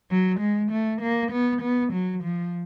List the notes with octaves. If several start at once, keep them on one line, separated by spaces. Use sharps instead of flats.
F#3
G#3
A3
A#3
B3
B3
F#3
F3